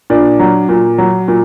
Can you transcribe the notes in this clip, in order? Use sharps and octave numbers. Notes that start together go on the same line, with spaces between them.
A#2 D4
F#3
A#2
F#3
A#2